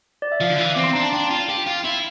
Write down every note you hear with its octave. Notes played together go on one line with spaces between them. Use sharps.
D5
E5
F3 F5
D3
E3
C4 D6
C6
D4 A#5
A5
D4 G5
F4
G4
F4
E4